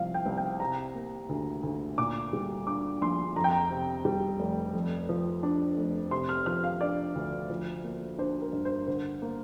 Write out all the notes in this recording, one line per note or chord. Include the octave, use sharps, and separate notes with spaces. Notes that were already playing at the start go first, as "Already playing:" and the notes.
Already playing: C2 C3 F3 F5
G5
C2
G5
C3 A#5
A#3
D2
D2
A#2 D6
G3
D4 D6
A#1 C6
F2 A#5
G5
A#5
C3
G3
F1
F2
F3
D4
F1
C3 C6
F6
F3 F6
F5
D4 D5
D2
F3
A#3
D4 C5
A#4
G2
C5
D3 C5
A#3